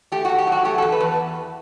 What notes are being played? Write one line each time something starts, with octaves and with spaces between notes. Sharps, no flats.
A3 G4
F#4
A3
G4
F#3 F#4
A3 G4
E2 A4
B4
E2